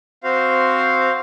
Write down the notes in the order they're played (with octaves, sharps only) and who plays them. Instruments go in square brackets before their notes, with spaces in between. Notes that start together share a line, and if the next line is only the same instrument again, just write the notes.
[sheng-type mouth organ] C4 F#4 C5 F5